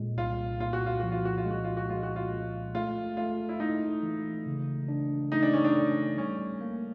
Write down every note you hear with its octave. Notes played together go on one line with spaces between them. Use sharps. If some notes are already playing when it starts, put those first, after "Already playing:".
Already playing: A#2 G#3
C2 F4
A#2 F4
F#4
F4
F3 F#4
F4
F#4
F4
G#3
F#4
F4
F#4
G#3 F4
F#4
F4
G#3
A3 F4
A3 F4
E4
A3 D#4
E3
C#3
D4
A3 D#4
D4
C#4
D4
A3
G3 C#4
A#3